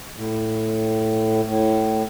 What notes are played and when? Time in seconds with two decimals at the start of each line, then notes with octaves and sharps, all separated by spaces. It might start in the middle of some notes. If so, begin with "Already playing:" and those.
0.17 A2
1.46 A2